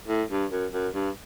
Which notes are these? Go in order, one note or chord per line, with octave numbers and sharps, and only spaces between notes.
A2
G2
F#2
F#2
G2